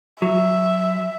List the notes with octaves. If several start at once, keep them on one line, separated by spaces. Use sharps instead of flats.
F#3 E5